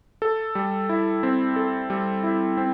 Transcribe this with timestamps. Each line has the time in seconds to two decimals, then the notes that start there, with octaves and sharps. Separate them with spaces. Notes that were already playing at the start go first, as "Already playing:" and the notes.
0.22 A4
0.55 G3
0.89 E4
1.23 C4
1.56 A4
1.90 G3
2.24 E4
2.57 C4